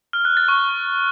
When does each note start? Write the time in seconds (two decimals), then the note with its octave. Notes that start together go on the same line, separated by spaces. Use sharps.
0.13 F6
0.25 F#6
0.37 A6
0.48 C#6